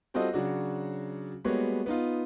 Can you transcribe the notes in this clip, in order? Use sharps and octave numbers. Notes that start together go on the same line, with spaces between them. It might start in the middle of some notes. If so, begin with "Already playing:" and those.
G3 C4 F4 F#4 A4 D#5
C#3 F#3 D4 F#4
G3 G#3 A#3 B3 F#4 C#5
B3 D#4 F4